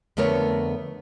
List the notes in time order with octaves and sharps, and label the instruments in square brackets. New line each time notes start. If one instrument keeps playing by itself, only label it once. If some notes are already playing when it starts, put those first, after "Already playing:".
[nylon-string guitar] F2 D3 A3 B3 A#4 C#5